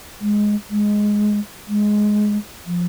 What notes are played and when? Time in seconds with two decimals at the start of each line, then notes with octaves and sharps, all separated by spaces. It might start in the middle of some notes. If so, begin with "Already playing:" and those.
0.20 G#3
0.70 G#3
1.68 G#3
2.66 F3